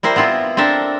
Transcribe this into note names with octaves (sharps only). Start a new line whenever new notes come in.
G3 E4 A#4 C5
B3 C4 E4 F4
C4 D4 A4 A#4 E5